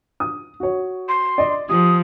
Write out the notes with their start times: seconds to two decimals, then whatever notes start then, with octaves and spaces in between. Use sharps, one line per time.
0.20 D#6
0.60 F#4 C#5
1.09 C6
1.38 D5 D#5
1.69 F3 G4 D#6